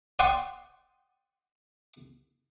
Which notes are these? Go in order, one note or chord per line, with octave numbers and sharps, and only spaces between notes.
D5 F#5 G5 C6 C#6 D#6